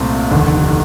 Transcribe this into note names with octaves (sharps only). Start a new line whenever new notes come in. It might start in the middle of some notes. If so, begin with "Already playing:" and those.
Already playing: C2 A#2 A3 C4 F4
F1 D#2 D3